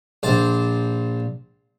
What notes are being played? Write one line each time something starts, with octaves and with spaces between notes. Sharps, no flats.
A#1 C5 A5